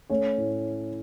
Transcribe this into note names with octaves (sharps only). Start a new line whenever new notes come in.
A3 C#4 C#5
A2